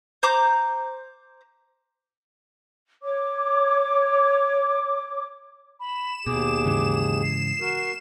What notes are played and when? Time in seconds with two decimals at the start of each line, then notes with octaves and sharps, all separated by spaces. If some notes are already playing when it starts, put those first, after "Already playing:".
0.23 C5 A#5 D6 G6
3.02 C#5 D6
5.80 B5 E7
6.27 D#2 B2 G#4 D6
6.65 G#2 C#3 E3
7.23 C7
7.61 F#4 A#4